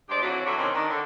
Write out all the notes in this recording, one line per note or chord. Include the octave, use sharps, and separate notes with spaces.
G2 G#3 G4 C5 D5
F2 E3 F#3
D3 F#3 G3 E4 F#4
C3 D#3 C4 C#4
D#3 D4
D3